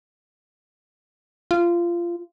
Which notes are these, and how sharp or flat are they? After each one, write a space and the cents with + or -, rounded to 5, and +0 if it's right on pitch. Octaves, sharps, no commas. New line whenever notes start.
F4 -20